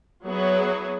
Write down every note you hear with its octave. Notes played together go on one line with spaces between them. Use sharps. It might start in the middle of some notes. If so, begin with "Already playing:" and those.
F#3 B3 E4 G#4 C#5